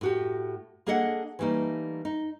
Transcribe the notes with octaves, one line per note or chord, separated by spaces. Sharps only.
A2 F#4 G4
A#3 D4 G#4 A4 D#5 F#5
E3 G3 A3 A#3 D#4
D#4